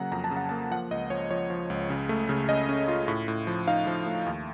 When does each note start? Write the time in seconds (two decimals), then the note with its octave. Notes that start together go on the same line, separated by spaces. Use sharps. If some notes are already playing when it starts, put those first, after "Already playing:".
Already playing: C#3 F#3 A#3 F#5 A#5
0.12 F2 A#5
0.24 A5
0.31 C#3
0.37 F#5
0.49 A#3 A5
0.71 F3 F#5
0.91 C#2 D#5
1.10 F3 C#5
1.30 F3 C#5
1.50 F3
1.70 C#2
1.90 C#3
2.09 A3
2.29 C#3
2.49 C#4 D#5
2.69 C#4
2.88 F4
3.08 A2
3.28 A2
3.47 F3
3.68 D#4 F5
3.87 F3
4.06 A3
4.26 D#2